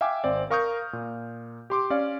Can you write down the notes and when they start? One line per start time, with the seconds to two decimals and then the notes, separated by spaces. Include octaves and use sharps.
0.01 E5 F5 G5 G#5 D6
0.24 G#1 C4 D5
0.50 A#4 F5 C#6 D#6 F6 G6
0.93 A#2
1.70 G4 C6 D6
1.90 C#4 D5 F5